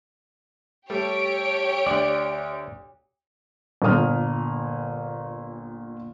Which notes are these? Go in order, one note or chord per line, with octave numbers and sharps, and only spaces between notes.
G3 A3 G4 C#5 D7
D2 D5
G1 A#2 A#3 D#6 F6